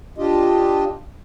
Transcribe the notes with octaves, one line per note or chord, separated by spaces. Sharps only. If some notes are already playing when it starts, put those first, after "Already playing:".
D4 F4 G4 D#5